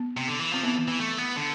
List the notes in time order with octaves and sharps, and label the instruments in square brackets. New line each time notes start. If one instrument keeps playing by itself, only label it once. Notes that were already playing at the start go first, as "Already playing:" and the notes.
Already playing: [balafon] B3
[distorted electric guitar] C3
D3
E3
[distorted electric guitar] F3 [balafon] C4
[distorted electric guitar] E3 [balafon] B3
[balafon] B3
[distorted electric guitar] E3
A3
B3
D3